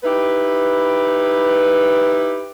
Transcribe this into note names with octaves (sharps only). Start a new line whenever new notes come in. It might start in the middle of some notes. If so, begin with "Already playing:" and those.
D#4 E4 G4 B4